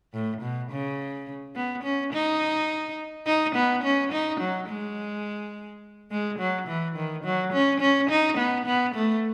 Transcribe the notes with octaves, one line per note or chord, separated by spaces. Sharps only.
A2
B2
C#3
B3
C#4
D#4
D#4
B3
C#4
D#4
F#3
G#3
G#3
F#3
E3
D#3
F#3
C#4
C#4
D#4
B3
B3
A3